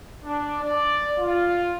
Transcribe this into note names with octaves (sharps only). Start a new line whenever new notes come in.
D4
D5
F4